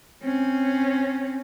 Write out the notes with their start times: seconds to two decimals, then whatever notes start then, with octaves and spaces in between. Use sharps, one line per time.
0.23 C4 C#4